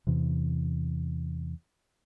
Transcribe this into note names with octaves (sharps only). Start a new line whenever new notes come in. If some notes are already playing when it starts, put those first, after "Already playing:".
E2 C3 E3